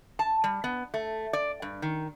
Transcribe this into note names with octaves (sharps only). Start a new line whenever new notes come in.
A5
G3
B3
A3
D5
G2
D#3